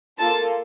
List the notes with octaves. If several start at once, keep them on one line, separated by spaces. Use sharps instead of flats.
A#3 F4 A4 A5